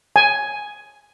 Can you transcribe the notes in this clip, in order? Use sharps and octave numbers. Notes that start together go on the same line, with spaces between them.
G#5